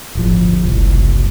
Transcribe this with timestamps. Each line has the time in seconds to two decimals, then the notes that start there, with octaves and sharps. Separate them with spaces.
0.15 D1 G1 F3
0.64 F#1 C2